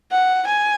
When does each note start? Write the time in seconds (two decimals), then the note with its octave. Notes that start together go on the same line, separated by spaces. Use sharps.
0.12 F#5
0.47 G#5